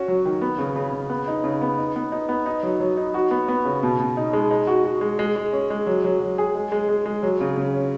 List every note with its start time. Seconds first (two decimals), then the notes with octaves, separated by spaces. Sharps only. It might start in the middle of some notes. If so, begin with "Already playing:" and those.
Already playing: C#4 F#4
0.08 F#3
0.25 D#3
0.41 B3
0.58 C#3
0.76 C#3
0.93 C#3
1.09 B3
1.28 D#4
1.44 C#3
1.61 B3
1.78 D#4
1.96 B3
2.12 D#4
2.29 B3
2.46 D#4
2.63 F#3
2.80 F#3
2.97 D#4
3.14 F#4
3.31 B3
3.48 B3
3.65 C#3
3.83 B2
3.99 B2
4.17 D#4
4.33 G#3
4.51 D#4
4.67 F#4
4.84 F#4
5.01 G#3
5.19 G#3
5.36 G#3
5.53 C#4
5.70 G#3
5.86 F#3
6.04 F#3
6.21 F#3
6.38 G#4
6.55 G#3
6.72 G#3
6.89 G#3
7.05 G#3
7.23 F#3
7.41 C#3
7.57 C#3
7.74 C#4